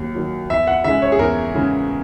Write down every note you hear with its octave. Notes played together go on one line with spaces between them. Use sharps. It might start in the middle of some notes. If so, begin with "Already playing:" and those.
Already playing: D#2 F#3
D#3 F#3
E2 E5
F#5
C#3 G#3 E5
C#5
G#4
E2 A#4
C#3 G#3